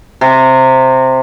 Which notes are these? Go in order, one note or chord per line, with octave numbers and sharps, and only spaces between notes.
C3